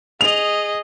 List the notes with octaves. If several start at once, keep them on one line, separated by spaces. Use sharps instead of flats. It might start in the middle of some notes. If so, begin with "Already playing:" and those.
G#4 D#5 F7